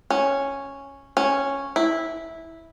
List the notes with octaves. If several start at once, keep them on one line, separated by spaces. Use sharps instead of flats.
C#4
C#4
E4